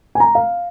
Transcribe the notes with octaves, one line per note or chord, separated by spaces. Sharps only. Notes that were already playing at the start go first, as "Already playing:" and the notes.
G#5
A#5
F5